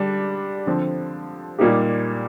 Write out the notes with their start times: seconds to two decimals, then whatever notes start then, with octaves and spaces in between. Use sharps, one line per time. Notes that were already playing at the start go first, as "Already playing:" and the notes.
Already playing: D3 G3 D4
0.67 D3 F3 C4
1.59 A#2 G3 A#3 D#4 G4